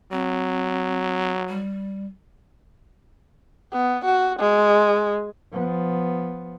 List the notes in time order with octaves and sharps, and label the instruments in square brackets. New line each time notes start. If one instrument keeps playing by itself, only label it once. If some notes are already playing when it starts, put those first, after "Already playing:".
[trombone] F#3 [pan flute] C4
[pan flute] G3
[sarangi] B3
F#4
G#3
[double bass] F3 B3